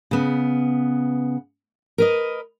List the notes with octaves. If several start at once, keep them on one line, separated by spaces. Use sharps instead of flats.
C#3 B3
A#4 B4 D#5